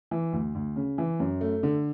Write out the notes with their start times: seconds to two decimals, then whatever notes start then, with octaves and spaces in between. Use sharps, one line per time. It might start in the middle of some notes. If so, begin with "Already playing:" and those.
0.11 E3
0.33 D2
0.55 D2
0.76 C#3
0.98 E3
1.20 F#2
1.41 A3
1.63 D3